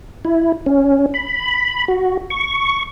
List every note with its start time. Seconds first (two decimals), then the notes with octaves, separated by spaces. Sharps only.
0.25 E4
0.66 C#4
1.14 B5
1.88 F#4
2.30 C#6